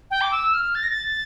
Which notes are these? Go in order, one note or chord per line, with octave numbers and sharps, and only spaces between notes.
G5
D6
E6
F6
A6
A#6
A6